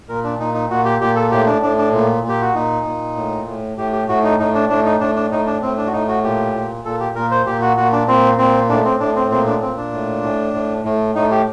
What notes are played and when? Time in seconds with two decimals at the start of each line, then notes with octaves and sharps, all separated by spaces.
0.09 A#2 A#4
0.24 D4
0.39 A#2 D#4
0.54 D#4
0.70 A#2 F#4
0.85 G4
1.01 A#2 G4
1.16 A4
1.31 A2 G4
1.47 D4
1.62 A2 D4
1.78 D4
1.93 A#2
2.24 A#2 G4
2.42 F#4
2.54 A#2 D#4
2.85 A#2
3.16 A2
3.46 A2
3.77 A2 G4
3.93 G4
4.08 A2 F#4
4.24 D#4
4.39 A2 D#4
4.55 D4
4.69 A2 D4
4.85 D#4
5.00 A2 D4
5.16 D4
5.31 A2 D#4
5.47 D4
5.62 A2 C4
5.77 D4
5.87 F#4
5.93 A2 D#4
6.08 F#4
6.23 A#2 G4
6.54 A#2
6.85 A#2 A4
7.00 G4
7.15 A#2 A#4
7.31 C5
7.46 A#2 G4
7.62 F#4
7.77 A#2 F#4
7.92 D4
8.08 A#2 C4
8.38 A#2 C4
8.69 A2 D4
8.85 C4
9.00 A2 D4
9.16 C4
9.31 A#2 C4
9.47 D4
9.62 A#2 C4
9.77 D4
9.92 A2
10.23 A2
10.54 A2
10.84 A2
11.15 A2 D#4
11.31 G4